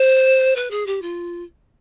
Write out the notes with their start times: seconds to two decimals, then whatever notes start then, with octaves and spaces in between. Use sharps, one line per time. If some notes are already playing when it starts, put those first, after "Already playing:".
Already playing: C5
0.56 B4
0.71 G#4
0.86 G4
1.02 F4